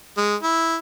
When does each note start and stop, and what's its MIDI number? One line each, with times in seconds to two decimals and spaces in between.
0.17 0.36 56
0.43 0.76 64